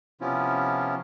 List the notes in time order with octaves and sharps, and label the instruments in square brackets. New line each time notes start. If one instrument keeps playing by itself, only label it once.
[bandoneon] C3 F3 B3 C#4 E4 F4